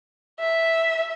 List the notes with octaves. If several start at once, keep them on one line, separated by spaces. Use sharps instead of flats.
E5